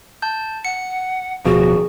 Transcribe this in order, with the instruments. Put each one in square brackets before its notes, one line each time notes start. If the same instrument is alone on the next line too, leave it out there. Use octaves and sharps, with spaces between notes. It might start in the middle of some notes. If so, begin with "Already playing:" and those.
[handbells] A5 G6
[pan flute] F#5 [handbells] C#7
[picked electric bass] D1 B2 F3 [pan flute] F#4 [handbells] G#4